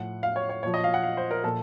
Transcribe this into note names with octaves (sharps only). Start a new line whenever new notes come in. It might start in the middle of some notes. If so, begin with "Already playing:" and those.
Already playing: A2 F3 F#5
F5
C#5
C#5
A#2 F3 C#5
D#5
F5
F#5
F5
C5
A#4
A#2 F3 A4